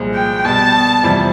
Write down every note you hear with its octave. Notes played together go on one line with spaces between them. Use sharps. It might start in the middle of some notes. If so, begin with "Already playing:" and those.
Already playing: C2 A#2 F3 G#3
G5
B2 G3 B3 A5
F2 C3 E3 G3